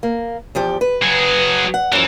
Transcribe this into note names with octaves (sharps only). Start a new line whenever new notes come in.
A#3
E2 F3 G4
B4
F#3 G#4
F#5
F#2 E3 F3